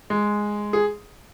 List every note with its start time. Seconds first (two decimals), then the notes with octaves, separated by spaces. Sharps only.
0.10 G#3
0.73 G#4